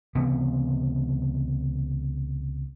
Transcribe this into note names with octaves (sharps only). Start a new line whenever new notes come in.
C#2 C3 E3 B3